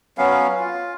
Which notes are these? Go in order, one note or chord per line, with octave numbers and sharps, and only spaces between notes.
F#3 B3 C#4 F5
F4